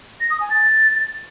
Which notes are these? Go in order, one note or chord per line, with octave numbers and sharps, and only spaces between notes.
A#6
D#6
G#5
A6